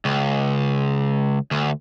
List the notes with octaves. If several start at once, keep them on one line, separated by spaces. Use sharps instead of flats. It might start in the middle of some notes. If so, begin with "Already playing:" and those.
C#2
D2